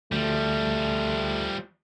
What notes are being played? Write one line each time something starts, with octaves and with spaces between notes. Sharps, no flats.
D2 F3 G3 A3